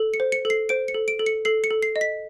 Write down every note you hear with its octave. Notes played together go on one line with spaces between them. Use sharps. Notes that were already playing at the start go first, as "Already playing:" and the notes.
Already playing: A4
C#7
C5
C#7
A4
C7
C5 D7
C#7
A4
D7
A4
C#7
A4 C7
C#7
A4
C7
D#5
B6